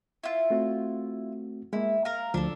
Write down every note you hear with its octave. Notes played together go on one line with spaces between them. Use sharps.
E4 F4
A3 C4 F#4
G#3 A#3 E4
A#4 F5 A#5
D2 F3 D4 A4